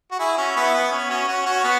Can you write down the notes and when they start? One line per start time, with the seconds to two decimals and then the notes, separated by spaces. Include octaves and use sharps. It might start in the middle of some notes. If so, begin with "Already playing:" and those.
0.11 F#4
0.19 E4 G#4
0.37 C#4 F#4
0.56 B3 E4
0.74 B3
0.91 C#4
1.10 C#4 F#4
1.28 C#4 F#4
1.46 C#4 F#4
1.64 B3